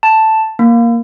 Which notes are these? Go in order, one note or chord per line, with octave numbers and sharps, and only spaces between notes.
A5
A#3